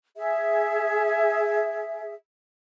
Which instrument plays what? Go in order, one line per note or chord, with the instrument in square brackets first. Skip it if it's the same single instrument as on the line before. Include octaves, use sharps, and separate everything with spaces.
[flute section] G#4 E5